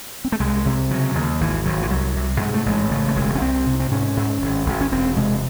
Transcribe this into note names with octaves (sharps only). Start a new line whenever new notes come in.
C4
A3
C2 G#3
C3
C#3 F#3
D#2
G#1 E3
G#1 F#3
E3
C2 F#3
C3
G#2 G#3
A3
A1 G#3
C#3 A3
A3
E1 G#3
C#4
C2 C4
C3
C4
G#2 C#4
G#2
G#1
G#1
C#4
E1 C4
C3 G#3